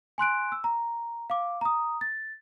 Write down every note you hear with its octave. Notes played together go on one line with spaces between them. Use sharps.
G#5 C6 F#6 D7
E6
A#5
F5 D6
A#5 D#6
A6